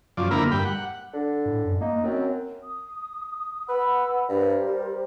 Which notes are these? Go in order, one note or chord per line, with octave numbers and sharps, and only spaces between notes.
F#2 F3 D5
F2 D3 A#3 E4 A#4 B5
G2 G5 B5
F#5
D3
A2
F#2
A#3 D#4
F#2 C4
D#6
B4 F#5 B5 E6
G2 G4 A#4 C5
G3